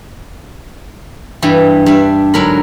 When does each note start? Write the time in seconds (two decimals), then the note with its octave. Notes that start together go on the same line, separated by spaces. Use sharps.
1.42 G2 E3 G3
1.86 G2 D4 E5
2.34 G#2 D3 F#3 A#4 B5